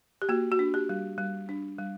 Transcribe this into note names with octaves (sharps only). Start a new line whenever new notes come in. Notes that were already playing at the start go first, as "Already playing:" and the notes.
G4
A#3 F#4
F#4
D4
G4
G3
G3
D4
G3